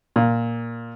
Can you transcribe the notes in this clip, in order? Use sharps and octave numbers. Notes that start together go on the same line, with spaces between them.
A#2